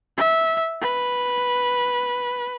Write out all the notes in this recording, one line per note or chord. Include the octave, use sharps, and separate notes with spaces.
E5
B4